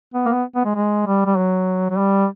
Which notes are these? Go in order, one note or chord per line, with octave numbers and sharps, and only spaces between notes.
B3
A#3
B3
B3
G#3
G#3
G3
G3
F#3
F#3
G3